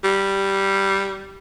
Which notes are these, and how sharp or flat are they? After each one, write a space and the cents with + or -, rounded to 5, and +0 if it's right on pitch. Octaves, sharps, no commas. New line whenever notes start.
G3 -5